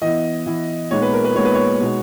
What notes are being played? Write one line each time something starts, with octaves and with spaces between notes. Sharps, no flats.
E3 B3 E4 D#5
E3 B3 E4
A#2 G#3 B3 D#4 C#5
B4
A#4
B4
A#2 G#3 B3 D#4 C#5
B4
C#5
B2 G#3 B3 D#4